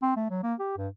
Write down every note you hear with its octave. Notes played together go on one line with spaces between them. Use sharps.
C4
A3
F#3
A#3
G4
G2